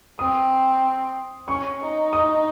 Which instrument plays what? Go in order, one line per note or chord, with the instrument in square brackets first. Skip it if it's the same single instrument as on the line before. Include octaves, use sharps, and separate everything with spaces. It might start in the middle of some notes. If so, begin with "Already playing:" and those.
[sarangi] C4 [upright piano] D#6
[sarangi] C#4 [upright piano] C#6
[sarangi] D#4
[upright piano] D#6